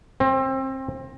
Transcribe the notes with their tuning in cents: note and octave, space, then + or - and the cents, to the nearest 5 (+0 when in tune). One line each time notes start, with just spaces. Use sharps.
C4 +25